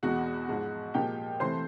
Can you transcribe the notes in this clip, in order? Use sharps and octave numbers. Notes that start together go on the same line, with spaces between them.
E2 B2 G#3 F#4 F#5
G#2 F3 G#3
A#2 F3 G#3 G4 G5
C3 E3 A3 C5 C6